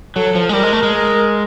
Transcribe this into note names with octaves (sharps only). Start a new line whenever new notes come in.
F#3 A4
F3
G#3
G3 A#4
G#3
A3
G#3
A#4